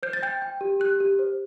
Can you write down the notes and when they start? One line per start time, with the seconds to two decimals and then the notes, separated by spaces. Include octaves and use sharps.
0.03 C5 G6
0.13 A6
0.23 G5 G6
0.42 G5
0.61 G4
0.80 G4 F#6
1.00 G4
1.19 C5